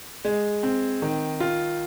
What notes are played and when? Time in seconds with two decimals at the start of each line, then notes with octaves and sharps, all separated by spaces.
0.25 G#3
0.63 C4
1.02 D#3
1.40 F4